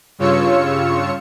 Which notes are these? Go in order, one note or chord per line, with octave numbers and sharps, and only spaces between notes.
G2 C#3 F4 C#5 E6 C#7